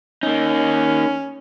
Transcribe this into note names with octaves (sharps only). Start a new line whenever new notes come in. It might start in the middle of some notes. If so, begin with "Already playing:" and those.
A#3 C#4 D#4